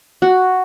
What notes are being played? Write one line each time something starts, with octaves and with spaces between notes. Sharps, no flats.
F#4